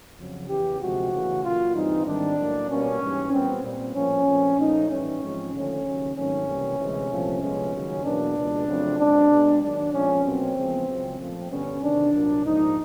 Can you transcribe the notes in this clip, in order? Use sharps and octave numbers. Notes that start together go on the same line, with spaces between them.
F2 C#3 F#3
E2 C#3 E3 G4
D2 C3 F3 G#3 F#4
E2 C#3 E3 A3
A#2 F#3 A#3 F4
G2 E3 G3 C4 D#4
G#2 D#3 G3 C4 D4
A2 F#3 A#3
B2 G3 A#3 C#4
G#2 E3 G3
A#2 G3 B3 C4
A#2 G3 C4
A2 F3 A#3 C#4
A#2 F3 A3 C4
A#2 F3 A3 D#4
A2 E3 G3 C#4
G#2 F3 G#3 C4
D#2 D3 F3 A3 C#4
D#2 C#3 F#3
G#2 D#3 F#3 A3 C4 C#4
C#2 C3 E3 G3 A#3
D2 C3 E3 G#3
C2 A#2 F3 A3 C4
C2 C3 F3 G#3 B3 C#4
D#2 C#3 F#3
E2 B2 F#3 A#3 D4
C#2 B2 G#3
F2 C#3 F#3 A3 C4
B2 G#3 C4 D4
B2 G#3 B3
D#2 D#3 F#3 D4
A#2 F3 G#3 C4 C#4
B2 F#3 A#3 C4
E2 C#3 F3 G#3 B3
C#2 C#3 F#3
A#2 F3 A3 C4
G2 D3 G3 B3 C#4
E2 C3 D#3 D4
C2 A#2 F#3 A#3
G#2 F3 A#3 D#4